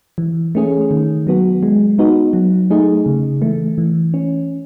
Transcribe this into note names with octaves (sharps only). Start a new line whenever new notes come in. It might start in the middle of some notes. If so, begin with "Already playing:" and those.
E3
A3 C#4 G#4
D#3
F#3 B3 F#4
G#3
B3 D#4 F#4
F#3
A3 D#4 G#4
C#3
E3 A3
E3
C#4